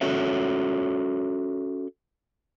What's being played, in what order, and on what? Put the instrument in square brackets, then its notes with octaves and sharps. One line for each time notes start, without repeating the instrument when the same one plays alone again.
[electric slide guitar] C#4 F#4 A4 C#5 E5